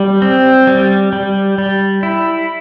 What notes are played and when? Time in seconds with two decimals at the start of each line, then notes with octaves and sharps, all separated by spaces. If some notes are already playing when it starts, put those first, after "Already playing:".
Already playing: G3
0.22 C4
0.67 G3
1.13 G3
1.58 G3
2.03 E4